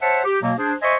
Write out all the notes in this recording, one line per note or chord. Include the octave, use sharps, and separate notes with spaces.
C5 C#5 E5 F#5 A5
G4
B2 F#3 A#3
D4 G#4 C5
C5 D#5 E5 G#5 C6 C#6